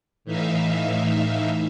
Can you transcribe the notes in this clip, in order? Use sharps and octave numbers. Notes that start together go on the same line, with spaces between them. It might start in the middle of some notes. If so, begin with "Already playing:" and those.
A2 E3 D#4 E5 F5